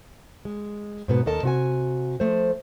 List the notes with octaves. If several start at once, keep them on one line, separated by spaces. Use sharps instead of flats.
G#3
G#2 B2 B3
D#2 A4 A#4 D#5 A5
C3 F#4 G#5
F3 A3 C5